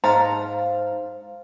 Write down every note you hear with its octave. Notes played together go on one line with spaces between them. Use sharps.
G#2 C5 F5 A5 A#5